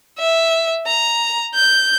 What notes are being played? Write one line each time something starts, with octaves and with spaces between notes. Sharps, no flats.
E5
A#5
G6